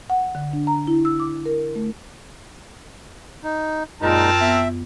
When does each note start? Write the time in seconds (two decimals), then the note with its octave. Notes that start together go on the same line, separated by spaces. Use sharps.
0.10 F#5
0.35 D3
0.53 D4
0.67 A#5
0.87 E4
1.05 E6
1.20 D6
1.46 A#4
1.75 A3
3.44 D#4
4.01 F#2 A#2 G#3 C4 D#4 F4 A#4 A5
4.41 B3 E5